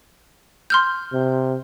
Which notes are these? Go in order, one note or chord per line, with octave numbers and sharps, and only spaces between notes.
C6 F6 G6
C3